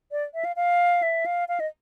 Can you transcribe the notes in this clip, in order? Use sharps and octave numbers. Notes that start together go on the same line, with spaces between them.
D5
E5
F5
F5
E5
F5
F5
D#5